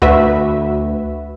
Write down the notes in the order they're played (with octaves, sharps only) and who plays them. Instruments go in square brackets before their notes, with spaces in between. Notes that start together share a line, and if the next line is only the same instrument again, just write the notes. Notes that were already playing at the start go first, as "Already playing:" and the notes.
[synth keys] D2 [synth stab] F#4 B4 E5